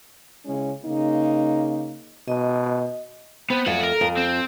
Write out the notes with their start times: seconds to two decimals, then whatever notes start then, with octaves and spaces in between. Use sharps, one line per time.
0.46 C#3 G#3 C#4 E4
0.85 C#3 A#3 D#4
2.28 B2 D#5
3.50 B3 C4
3.66 F2 A3 C#5 F#5
3.83 A#4
4.01 F2
4.17 C4